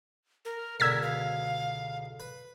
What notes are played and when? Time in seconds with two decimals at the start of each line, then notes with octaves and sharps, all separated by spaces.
0.45 A#4
0.80 C#2 B2 D3 A#4 E6 G#6 B6
1.02 F5
2.20 B4